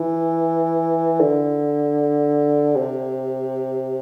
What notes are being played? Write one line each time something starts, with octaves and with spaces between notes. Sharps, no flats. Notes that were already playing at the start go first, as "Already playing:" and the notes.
Already playing: E3
D3
C3